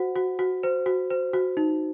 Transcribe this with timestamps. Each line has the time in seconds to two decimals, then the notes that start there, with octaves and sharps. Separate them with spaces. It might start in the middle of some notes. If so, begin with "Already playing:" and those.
Already playing: F#4 C5 F#5
0.16 F#4
0.39 F#4
0.64 C5
0.86 F#4
1.10 C5
1.33 F#4
1.57 D#4